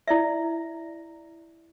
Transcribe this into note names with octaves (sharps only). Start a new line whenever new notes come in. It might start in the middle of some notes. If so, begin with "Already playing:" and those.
E4 D5 E5